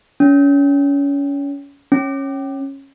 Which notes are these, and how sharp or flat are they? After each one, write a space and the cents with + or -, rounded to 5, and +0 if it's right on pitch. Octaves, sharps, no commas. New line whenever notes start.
C#4 +25
C#4 -15